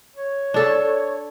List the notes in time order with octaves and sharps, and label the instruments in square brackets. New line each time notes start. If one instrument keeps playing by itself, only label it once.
[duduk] C#5
[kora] D4 A4